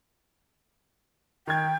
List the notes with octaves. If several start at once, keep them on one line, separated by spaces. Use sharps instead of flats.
D#3 G5 G#6